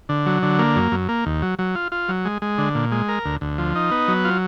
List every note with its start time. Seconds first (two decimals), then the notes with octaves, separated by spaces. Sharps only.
0.09 D3
0.26 F#3
0.42 D3
0.59 A#3
0.76 F#2
0.92 F#2
1.09 A#3
1.26 D#2
1.42 F#3
1.59 F#3
1.75 F4
1.92 F4
2.09 F#3
2.25 G#3
2.42 G#3
2.58 D3
2.75 A#2
2.92 G#3
3.08 A#4
3.25 D2
3.41 D2
3.58 F3
3.75 D#4
3.91 B3
4.08 F#3
4.25 F4